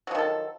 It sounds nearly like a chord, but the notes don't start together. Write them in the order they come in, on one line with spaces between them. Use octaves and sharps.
F#3 F3 D#3 A4